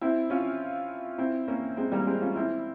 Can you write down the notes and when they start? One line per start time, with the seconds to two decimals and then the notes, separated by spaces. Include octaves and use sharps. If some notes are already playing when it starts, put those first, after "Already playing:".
0.01 C4 E4
0.30 C#4 F4
1.18 C4 E4
1.48 A#3 C#4
1.77 G#3 C4
1.92 G3 A#3
2.07 G#3 C4
2.21 C#4 F4
2.35 C4 E4